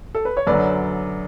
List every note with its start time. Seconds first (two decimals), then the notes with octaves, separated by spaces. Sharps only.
0.15 A4
0.25 B4
0.37 C#5
0.47 F#2 D3 F#3 B4 D5